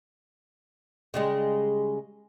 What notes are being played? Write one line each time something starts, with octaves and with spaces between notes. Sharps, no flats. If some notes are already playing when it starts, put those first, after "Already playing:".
C#3 G3 G#3